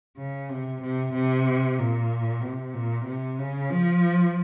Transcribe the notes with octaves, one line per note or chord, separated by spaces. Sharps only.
C#3
C3
C3
C3
A#2
C3
A#2
C3
C#3
F3